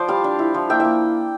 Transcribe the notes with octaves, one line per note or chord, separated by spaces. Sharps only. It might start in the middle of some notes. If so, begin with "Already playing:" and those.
Already playing: F3 C5 D5
G3 F5 A5
D4
E4
F3
A#3 E5 G5
A#3 E5 G5